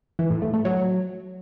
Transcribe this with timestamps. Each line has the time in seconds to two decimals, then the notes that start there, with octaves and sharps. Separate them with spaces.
0.19 E3
0.30 A2
0.42 A3
0.53 A3
0.65 F#3